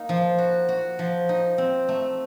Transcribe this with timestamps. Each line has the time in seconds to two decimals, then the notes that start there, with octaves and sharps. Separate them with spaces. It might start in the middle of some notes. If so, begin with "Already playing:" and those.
Already playing: A#3 D#4
0.09 F3
0.38 F#4
0.69 F#4
0.99 F3
1.29 D#4
1.58 C4
1.89 A3